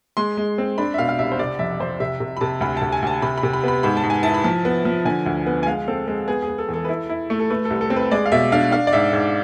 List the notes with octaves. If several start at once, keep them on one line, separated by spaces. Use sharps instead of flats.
G#3 C6
G#3
C4
D4 B5
E5
B2 F5
F5
C2 E5
C5
C3 D5
F2 E5
F2 C5
C3 E5
C3
B5
C3 A5
D2 B5
D2 A5
G#5
D2 A5
C3 B5
B5
C3
B5
B3 B5
G#2 B5
A5
G#2
G#5
E4 A5
B5
F3 A5
B3
F3
D3 G#5
D2
B3
G#5
G#3 F5
C4 A4
G#3 A4
B3 G#4
G#4
B3
A4
E2
A4
B4
E4 A4
E4
A3
A4
A3 B4
A4
C2
A4
C4
B4
G#3 D5
F5
B2 E5
D4 F5
D4 F5
D5
G#2 E5
G#2